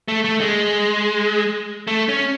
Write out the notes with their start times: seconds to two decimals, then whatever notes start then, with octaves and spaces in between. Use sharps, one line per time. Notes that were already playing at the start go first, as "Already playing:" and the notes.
0.08 A3
0.24 A3
0.41 G#3
1.87 A3
2.09 C#4